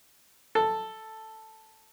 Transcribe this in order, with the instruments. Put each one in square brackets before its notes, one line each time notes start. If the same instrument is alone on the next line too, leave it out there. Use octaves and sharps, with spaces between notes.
[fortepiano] A4